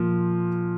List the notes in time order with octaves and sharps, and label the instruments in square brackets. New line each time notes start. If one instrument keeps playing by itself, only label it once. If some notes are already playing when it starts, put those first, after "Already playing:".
Already playing: [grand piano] A#2 F3